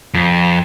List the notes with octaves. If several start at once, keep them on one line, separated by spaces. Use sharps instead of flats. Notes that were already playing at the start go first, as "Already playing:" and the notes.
F2